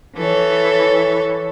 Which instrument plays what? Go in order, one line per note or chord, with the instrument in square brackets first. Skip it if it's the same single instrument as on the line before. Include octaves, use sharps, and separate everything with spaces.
[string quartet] E3 A4 C#5